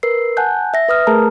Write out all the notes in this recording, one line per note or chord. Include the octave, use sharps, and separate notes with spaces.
A#4 B4 E6 C7
F#5 G#5 A5 F#6 G6
E5 A#6
B4 D#6 F6
A3 G#4 A#4 A5 A#5